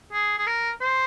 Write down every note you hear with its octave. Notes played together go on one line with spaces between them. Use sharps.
G#4
G#4
A#4
C5